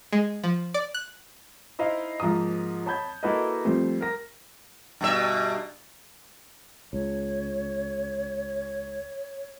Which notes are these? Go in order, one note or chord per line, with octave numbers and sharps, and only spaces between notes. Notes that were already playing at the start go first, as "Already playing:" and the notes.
G#3
F3
D5
F#6
D#4 E4 C5 D#5 F5
G#2 F3 A#3 A#5 D#6
C#5 A5 B5 G6 G#6
A#3 E4 F#4 A4 B4 D#5
F2 F3 G3 A3 C5
A#4 A#6
G2 B2 E5
C#2 C#5